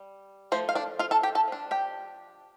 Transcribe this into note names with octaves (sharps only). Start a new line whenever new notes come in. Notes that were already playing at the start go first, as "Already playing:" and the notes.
Already playing: G3
F3 A3 C5
F5
D4 D5
F4 F5
A4 A5
G4 G5
A4 A5
F3 D4
G4 G5